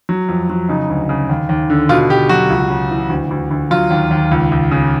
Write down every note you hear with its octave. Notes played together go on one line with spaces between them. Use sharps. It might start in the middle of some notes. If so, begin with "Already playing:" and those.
F#3
F2
F#3
C#3 D#4
D2
C#3
D#2
D#2
D3
B2 F4
B2 G4
F#3 F#4
C#2
C#3
E3
D2
D2
D2
F#3 F4
D#2
D#2
C#2
C#2
C#3